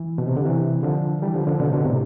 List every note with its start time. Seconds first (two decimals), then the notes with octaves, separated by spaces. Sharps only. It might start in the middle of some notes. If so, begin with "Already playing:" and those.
Already playing: E3
0.18 B2
0.27 C3
0.37 D3
0.45 C3 E3
0.83 D3 F3
1.22 E3 G3
1.34 D3 F3
1.47 D3 F3
1.59 B2 D3
1.67 C3
1.73 B2 D3
1.85 A2 C3